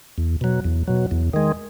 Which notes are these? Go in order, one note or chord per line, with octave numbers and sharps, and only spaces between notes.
E2
B2 F#3
E2
B2 F#3
E2
D#3 G#3